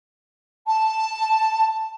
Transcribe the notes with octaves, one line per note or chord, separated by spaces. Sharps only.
A5